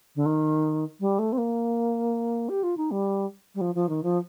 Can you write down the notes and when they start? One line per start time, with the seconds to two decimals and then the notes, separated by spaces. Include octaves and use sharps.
0.16 D3
0.26 D#3
1.00 G3
1.19 A3
1.32 C4
1.38 A#3
2.49 G4
2.63 F4
2.77 D#4
2.91 G3
3.55 G3
3.61 F3
3.75 F3
3.89 D#3
4.03 F3